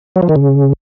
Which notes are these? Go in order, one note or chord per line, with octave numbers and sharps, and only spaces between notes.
F#3
F3
D#3
C#3